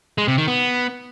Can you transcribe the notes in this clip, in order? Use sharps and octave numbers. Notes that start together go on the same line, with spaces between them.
G#3
C3
D#3
B3